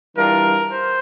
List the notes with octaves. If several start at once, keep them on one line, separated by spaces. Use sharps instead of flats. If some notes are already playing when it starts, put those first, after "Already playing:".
E3 G3 D4 F4 A#4
C5